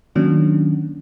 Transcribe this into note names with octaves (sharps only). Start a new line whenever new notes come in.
D#3 F#3 A#3 C#4 D4 F#4